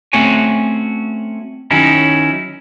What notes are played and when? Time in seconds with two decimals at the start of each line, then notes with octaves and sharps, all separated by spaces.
0.13 A3 C4 C#4 F#4 C#5 G#5
1.71 D#3 F#3 C#4 D#4 E4